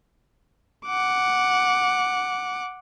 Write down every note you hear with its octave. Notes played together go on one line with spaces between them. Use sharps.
F#5 D6